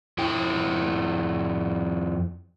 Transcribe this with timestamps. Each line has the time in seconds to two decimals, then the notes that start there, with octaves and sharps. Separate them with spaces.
0.18 F2 E4 G5